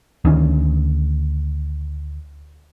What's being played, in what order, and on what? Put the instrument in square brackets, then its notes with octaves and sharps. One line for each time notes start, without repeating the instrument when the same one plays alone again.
[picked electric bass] D2 D#3 C#4